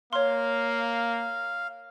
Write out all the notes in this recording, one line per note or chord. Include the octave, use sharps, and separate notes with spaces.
A#3 C#5 F5 C6